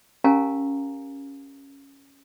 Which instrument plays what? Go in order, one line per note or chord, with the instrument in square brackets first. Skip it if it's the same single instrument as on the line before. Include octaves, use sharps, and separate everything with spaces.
[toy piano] C#4 G4 A#4 F5 G#5 A#5